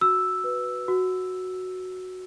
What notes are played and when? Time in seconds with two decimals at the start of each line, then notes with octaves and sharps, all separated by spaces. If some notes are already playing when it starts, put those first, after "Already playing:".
0.01 F#4 E6
0.44 B4
0.88 F#4